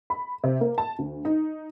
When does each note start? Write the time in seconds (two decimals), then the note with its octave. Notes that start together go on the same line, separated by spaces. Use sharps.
0.10 B5
0.44 C3
0.61 A#3
0.78 A5
0.99 D2
1.25 D#4